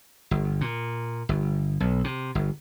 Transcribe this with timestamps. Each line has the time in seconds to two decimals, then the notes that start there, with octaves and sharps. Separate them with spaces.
0.31 G1
0.61 A#2
1.29 G1
1.80 B1
2.04 C3
2.35 G1